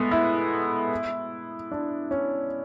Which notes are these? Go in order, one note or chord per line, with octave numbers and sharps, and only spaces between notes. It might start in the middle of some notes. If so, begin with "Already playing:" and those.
Already playing: G#3 A3 B3
E4
D4
C#4